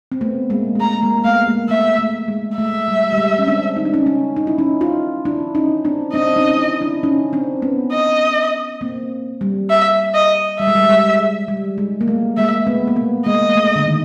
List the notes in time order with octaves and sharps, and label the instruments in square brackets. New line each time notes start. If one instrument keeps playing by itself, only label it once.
[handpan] C4
A3 B3
G#3 A#3
G#3
[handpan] A3 [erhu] A#5
[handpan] G#3 A#3
[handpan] A3 B3 [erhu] F5
[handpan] G#3 A#3
[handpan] A3 [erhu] E5
[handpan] A3
G#3
[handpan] A3 [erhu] E5
[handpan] G3
G3
G#3
C#4
C4 D4
D#4
D4
C#4 D#4
C#4 D#4
D#4
E4
C#4 D#4
D#4 F4
D4 E4
C#4 D#4
C4 D4
[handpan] C4 D4 [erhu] D#5
[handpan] C#4 D#4
D4 E4
D4 E4
C#4 D#4
C4 D4
B3 C#4
[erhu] D#5
[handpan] A#3 C4
G3
[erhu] E5
D#5
[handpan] G3 [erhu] E5
[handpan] G#3
G3
G#3
G3
G#3
G3
G#3
A#3
A3
[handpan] G#3 A#3 [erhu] E5
[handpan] A3 B3
A#3
A3 B3
[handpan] G#3 A#3 [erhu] D#5
[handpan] A3
D3
D#3